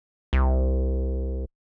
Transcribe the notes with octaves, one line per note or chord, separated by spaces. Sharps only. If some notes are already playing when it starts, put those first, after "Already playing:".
C2